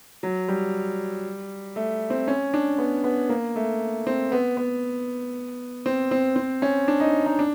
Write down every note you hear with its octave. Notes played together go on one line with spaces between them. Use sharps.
F#3
G3
A3
C4
C#4
D4
B3
B3
A#3
A3
C4
B3
B3
C4
C4
C4
C#4
D4
D#4
D#4
D4